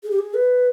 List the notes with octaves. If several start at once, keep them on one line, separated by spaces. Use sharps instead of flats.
G#4
G4
G#4
B4